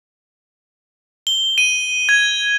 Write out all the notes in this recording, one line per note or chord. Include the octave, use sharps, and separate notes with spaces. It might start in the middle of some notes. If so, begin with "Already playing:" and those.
G7
D#7
G#6